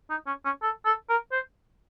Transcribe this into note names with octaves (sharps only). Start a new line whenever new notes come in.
D#4
C#4
C#4
A4
A4
A#4
C5